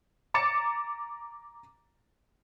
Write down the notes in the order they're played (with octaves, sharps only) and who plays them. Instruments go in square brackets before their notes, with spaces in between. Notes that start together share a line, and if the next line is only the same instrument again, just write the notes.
[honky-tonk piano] A#5 D6 A6 C#7 E7